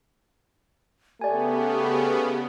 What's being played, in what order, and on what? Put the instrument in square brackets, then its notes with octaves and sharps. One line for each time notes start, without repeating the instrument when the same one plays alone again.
[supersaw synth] C#3 B3 [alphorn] A3 [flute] G4 [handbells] D5 G#5